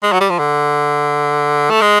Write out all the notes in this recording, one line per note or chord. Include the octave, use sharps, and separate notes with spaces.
G#3
F#3
G3
F3
D3
A3
G#3